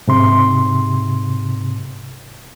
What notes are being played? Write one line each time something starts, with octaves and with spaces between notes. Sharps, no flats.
G#2 C3 C6